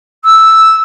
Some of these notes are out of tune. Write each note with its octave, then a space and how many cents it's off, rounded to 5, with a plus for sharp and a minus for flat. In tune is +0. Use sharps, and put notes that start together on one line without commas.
E6 -5